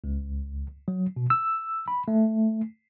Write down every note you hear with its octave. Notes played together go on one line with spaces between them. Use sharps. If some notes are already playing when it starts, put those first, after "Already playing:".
C#2
F#3
B2
E6
B5
A3